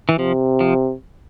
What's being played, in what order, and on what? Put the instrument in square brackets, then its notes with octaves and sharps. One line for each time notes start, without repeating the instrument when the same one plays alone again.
[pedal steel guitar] E3
[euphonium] C3 [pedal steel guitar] F3
[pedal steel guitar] F3